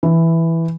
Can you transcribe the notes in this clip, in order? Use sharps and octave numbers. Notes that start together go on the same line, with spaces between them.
E3